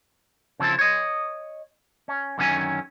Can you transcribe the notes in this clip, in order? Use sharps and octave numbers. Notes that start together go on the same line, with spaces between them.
C#3 F3 C4 E4 A4
C#5 D#5
C#4
F#2 D3 D#3 C#4 G#5